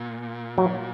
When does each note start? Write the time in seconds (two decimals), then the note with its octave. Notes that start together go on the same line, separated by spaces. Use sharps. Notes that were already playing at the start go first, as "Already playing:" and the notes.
Already playing: A#2
0.58 F#3